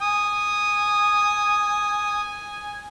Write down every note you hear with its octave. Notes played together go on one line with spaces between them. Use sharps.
G#5 D#6